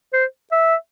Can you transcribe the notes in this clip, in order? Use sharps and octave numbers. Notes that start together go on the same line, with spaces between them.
C5
E5